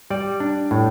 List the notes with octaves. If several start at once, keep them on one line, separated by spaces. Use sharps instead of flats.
G3 D5
D4
A2